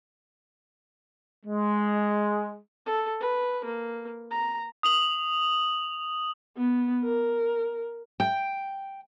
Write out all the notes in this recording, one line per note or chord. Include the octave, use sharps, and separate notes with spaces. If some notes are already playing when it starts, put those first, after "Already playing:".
G#3
A4
B4
A#3
A#5
D#6 F7 F#7
B3
A#4
G5